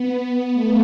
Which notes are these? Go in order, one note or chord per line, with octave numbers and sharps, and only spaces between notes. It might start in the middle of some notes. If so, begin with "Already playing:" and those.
Already playing: B3
A3